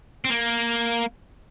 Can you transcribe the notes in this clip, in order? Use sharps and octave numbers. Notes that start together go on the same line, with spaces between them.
C4
A#3